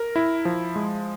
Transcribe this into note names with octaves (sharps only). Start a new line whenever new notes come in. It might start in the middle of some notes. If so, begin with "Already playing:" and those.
Already playing: A#4
E4
F3
G#3